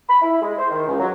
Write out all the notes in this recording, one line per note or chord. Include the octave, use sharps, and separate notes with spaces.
B5
E4
G#3
C5
D#3
C#2
F#3